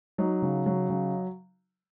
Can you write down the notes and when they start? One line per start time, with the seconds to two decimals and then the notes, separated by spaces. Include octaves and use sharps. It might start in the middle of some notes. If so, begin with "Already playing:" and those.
0.18 F#3 D#4
0.42 C#3
0.66 F#3
0.90 C#3